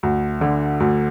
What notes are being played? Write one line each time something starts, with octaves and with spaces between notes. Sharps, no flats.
D2
D3
D2